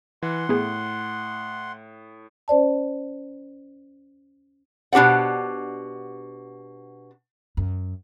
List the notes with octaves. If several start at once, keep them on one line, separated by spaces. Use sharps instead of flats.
E3 F#5 C6
A2 B3 G#4
C#4 C5 D5 A5
B2 D4 G4 C5 F#5
F#2